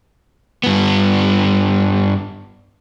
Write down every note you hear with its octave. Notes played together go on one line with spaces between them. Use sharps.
G2 B3